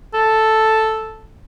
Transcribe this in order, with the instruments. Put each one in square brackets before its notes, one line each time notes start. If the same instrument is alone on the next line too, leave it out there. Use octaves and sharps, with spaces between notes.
[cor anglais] A4